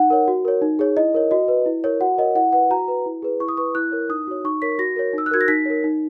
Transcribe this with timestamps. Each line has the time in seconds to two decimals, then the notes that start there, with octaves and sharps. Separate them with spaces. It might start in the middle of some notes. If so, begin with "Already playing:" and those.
Already playing: D#4 F#5
0.10 A#4 C#5
0.28 F#4
0.45 A#4 C#5
0.62 D#4
0.79 G#4 C#5
0.97 E4 D#5
1.14 A#4 C#5
1.31 F#4 D#5
1.48 B4
1.66 E4
1.84 A#4 C#5
2.01 F#4 F#5
2.18 A#4 C#5 D#5
2.35 E4 F#5
2.53 B4 F#5
2.70 F#4 A#5
2.88 B4
3.06 E4
3.22 G#4 B4
3.40 E4 C#6
3.48 D#6
3.57 B4 C#6
3.75 E4 F#6
3.92 A#4 C#5
4.09 D#4 D#6
4.27 F#4 C#5
4.44 D#4 C#6
4.62 A#4 C#5 B6
4.79 F#4 A#6
4.96 A#4 C#5
5.13 D#4 E6
5.26 F#6
5.31 F#4 A#4 G#6
5.41 A#6
5.48 D#4 B6
5.65 A#4 C#5
5.84 D#4